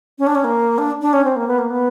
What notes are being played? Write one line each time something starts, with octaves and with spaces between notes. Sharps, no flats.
C#4
D4
C#4
A#3
D4
D4
C#4
C4
A#3
B3
A#3
B3